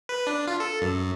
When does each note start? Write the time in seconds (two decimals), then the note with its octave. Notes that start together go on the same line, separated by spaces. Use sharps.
0.09 B4
0.27 D4
0.47 F4
0.60 A4
0.81 F#2